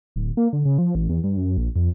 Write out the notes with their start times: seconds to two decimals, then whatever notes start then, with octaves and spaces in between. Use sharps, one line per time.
0.16 D1
0.37 A#3
0.53 D3
0.65 C#3
0.78 F3
0.95 A1
1.09 E2
1.24 G2
1.37 F#2
1.58 A#1
1.76 F2